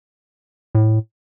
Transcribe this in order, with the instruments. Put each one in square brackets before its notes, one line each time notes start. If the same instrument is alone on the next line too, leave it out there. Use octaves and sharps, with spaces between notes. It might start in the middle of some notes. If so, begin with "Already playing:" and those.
[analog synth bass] A2